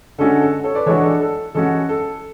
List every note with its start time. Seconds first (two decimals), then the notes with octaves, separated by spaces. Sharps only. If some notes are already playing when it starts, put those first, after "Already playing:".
0.18 D3 G#3 C#4 F#4 A4
0.30 A4
0.41 A4
0.64 A4 C#5
0.75 B4 D5
0.86 E3 G#3 D4 F#4 A4 C#5
1.03 A4
1.21 A4
1.55 E3 G#3 C#4 F#4 A4
1.89 A4